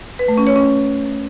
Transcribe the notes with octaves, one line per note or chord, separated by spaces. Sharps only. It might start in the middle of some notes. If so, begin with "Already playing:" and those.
B4
A3
C#4
C#5
C#4